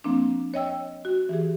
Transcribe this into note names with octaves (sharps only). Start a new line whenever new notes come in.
F3 A#3 C4 D4
C#5 D#5 G5 E6
F#4
E3 G4 G#4